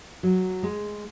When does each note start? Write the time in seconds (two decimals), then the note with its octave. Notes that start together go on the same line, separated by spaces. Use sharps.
0.23 F#3
0.63 G#3